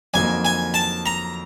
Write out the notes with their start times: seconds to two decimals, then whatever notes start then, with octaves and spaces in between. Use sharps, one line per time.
0.14 F2 D3 F#3 A#3 D#4 G#5
0.45 G#5
0.74 A5
1.06 A#5